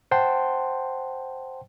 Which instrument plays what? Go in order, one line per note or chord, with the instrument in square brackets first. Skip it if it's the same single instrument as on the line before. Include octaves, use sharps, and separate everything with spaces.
[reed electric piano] C5 F#5 G5 A5 C6